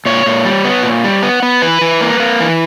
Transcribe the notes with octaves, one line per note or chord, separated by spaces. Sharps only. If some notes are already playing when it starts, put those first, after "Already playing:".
A#2 C#5
A#2
G3
B3
A#2
G3
B3
B3
E3 B4
E3
A#3
A#3
E3